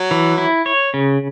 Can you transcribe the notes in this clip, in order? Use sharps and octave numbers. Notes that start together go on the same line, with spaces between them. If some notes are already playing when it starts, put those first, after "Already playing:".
Already playing: F#3
E3
E4
C#5
C#3